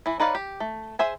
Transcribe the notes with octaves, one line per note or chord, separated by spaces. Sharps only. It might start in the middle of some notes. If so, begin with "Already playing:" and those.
E3 E4
D#4 B4 C#5 D5 F5
G4
A3
G#4 C5 E5 G#5